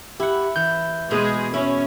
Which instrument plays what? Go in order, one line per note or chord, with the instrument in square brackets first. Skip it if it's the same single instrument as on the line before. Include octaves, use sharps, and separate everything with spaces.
[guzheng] E4 F#5 [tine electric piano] G4
[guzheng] E3 [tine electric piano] G6
[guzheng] B2 [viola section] G#3 G#4
[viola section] C#4 [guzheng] E4